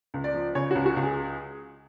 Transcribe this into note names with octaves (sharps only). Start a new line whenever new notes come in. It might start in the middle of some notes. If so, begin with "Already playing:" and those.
C#2
D5
F3
C#3 C#5
C#2 F#4
F#4
C#2
G#4